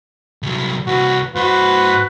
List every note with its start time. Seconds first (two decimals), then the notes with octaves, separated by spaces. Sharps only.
0.43 C2 F#3
0.87 C2 F#4 B4
1.35 G2 F#4 B4 C5